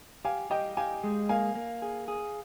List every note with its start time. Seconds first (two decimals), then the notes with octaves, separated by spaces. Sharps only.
0.25 G4 F5 G#5
0.51 G4 D#5 G5
0.77 G4 F5 G#5
1.04 G#3
1.29 A#3 F5 G#5
1.55 A#3
1.82 G#4
2.08 G#4